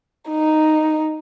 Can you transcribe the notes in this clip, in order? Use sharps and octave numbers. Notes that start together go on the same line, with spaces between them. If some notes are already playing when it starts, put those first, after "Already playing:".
D#4